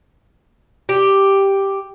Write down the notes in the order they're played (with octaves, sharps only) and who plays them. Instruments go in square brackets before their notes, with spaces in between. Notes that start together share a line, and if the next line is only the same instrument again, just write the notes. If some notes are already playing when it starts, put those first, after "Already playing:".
[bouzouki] G4